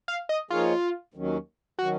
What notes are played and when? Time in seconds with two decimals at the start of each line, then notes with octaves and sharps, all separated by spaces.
0.08 F5
0.29 D#5
0.50 F3 A#3 D#4 F4 G#4 C#5
1.14 D#2 D#3 F#3 C#4
1.79 D#3 F#3 C#4 F#4